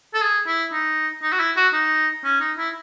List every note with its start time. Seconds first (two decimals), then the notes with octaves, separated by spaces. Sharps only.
0.14 A4
0.22 G#4
0.47 E4
0.72 D#4
1.22 D#4
1.32 F#4
1.39 E4
1.56 F#4
1.73 D#4
2.24 C#4
2.41 D#4
2.58 E4